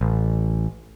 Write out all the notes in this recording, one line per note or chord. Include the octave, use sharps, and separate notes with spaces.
A1